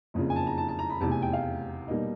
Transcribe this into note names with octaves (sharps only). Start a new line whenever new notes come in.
F#1 F2 C#3
G#5
A5
A#5
A5
A5
A#5
B5
F1 E2 C3 A5
G#5
G5
F5
B2 G3 A#3 D#4